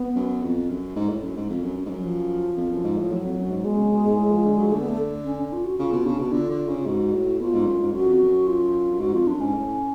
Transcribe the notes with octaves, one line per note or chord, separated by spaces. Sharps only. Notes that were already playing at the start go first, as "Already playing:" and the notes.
Already playing: B3
F#2
F2
F#2
G#2
A2
F#2
G#2
F2
F#2
F#2
G#2
F#2
F#3
F3
F2
F#2
G#2
A2
A2 F#3
F2
F#2
G#2
B2 G#3
C#3
B2
G#2
A2
F3
D3
F#3
F3
D3 A3
B3
A3
C#4
C#4
F4
F#4
C#3 F4
B2
C#3 D4
B2
D3 F4
D3
C#3
F4
G#2 F#4
A2
B2 F4
G#2
F#2
G#2
F#2 F#4
F2
F#2
F4
F#2
G#2 F#4
F2 F4
F#2 D4
G#2 C#4
A2